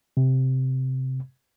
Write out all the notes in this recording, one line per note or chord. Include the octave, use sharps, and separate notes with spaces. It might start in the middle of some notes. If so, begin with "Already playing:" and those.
C3